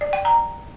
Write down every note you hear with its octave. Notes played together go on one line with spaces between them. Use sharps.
D5
G5
A#5